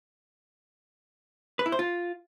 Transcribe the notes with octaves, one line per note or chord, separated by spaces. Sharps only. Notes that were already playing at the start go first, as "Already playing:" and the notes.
B4
E4
C5
F4